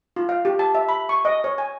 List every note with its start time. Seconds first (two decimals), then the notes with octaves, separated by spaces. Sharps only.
0.16 F4
0.29 F5
0.45 G4
0.59 A5
0.75 E5
0.89 B5
1.09 C#6
1.25 D#5
1.44 C#5
1.58 G#5